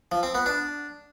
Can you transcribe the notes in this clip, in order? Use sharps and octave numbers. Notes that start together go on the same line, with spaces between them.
F3
C4
B3
D4